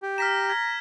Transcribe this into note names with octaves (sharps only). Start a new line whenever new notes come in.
G4
A#5 F6 B6 E7
G#6